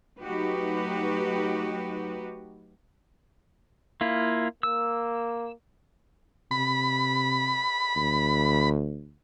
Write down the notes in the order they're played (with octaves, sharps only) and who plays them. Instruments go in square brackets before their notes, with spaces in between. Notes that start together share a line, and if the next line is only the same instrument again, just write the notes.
[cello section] F#3 A3 D#4 F#4 G4 B4
[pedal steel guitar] A#3 E4 F4
[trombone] A#3 [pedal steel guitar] E6
[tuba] C3 [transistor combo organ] B5
[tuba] D2